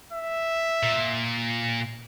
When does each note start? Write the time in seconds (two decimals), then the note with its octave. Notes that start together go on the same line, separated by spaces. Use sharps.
0.13 E5
0.83 A#2